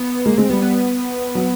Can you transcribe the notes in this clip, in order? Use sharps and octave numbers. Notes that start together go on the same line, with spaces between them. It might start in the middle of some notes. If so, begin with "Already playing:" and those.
Already playing: B3
G#3 A#3
G#3 C4
G3 B3
B3
F#3